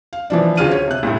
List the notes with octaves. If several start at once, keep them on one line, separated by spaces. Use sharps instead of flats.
F5
E3 F3 D4
D2 C#3 F4 F6 D#7
C#5
C3 F#6
C2 A2